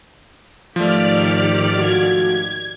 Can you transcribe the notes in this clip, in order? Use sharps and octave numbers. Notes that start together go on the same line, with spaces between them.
G#2 D#3 F3 A3 G4 D5 F6
F#4 G#6